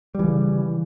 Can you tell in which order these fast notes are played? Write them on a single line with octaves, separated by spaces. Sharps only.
G3 E3 C#3